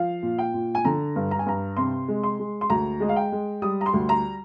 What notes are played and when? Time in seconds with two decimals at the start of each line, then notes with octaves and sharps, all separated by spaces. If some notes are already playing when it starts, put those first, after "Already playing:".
Already playing: F3 F5
0.22 A#2
0.38 G5
0.54 A#2
0.75 G#5
0.85 D3 A#5
1.16 G2
1.31 A#5
1.39 G#5
1.46 G2 A#5
1.77 C3 C6
2.08 G#3
2.23 C6
2.39 G#3
2.61 C6
2.70 D2 A#5
3.00 G#3 D#5
3.09 F5
3.16 G5
3.32 G#3
3.62 G3 D#6
3.81 A#5
3.86 C6
3.93 D2
4.09 A#5